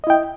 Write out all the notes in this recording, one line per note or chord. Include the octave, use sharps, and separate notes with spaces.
E4 D#5 G5